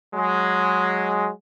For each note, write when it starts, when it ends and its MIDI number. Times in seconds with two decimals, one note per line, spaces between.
0.15 1.31 54
0.15 1.31 56